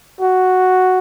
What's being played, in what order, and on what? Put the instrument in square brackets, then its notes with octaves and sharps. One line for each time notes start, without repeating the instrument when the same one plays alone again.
[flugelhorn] F#4